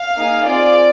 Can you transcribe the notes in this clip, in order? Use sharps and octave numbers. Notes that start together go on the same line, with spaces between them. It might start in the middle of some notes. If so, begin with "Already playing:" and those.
Already playing: F5
A#3 D#4 G#4
C4 F4 G#4 D5